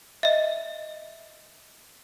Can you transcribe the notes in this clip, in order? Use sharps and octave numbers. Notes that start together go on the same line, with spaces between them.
D#5 E5